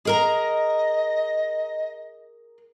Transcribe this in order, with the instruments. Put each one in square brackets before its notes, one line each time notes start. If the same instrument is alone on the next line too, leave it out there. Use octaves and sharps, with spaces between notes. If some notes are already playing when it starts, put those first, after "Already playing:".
[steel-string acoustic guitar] G#4 A#4 A#5 [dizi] D#5